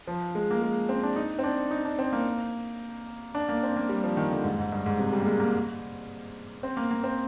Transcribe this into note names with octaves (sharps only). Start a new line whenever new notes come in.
F3
G#3
A#3
G#3
C4
D4
D#4
C4
D4
D#4
D4
C4
A#3
D4
A#3
C4
A#3
G3
F3
D#3
D3
G#2
G#2
G2
G#2
C3
G3
A#3
G#3
A#3
C4
A#3
A#3
C4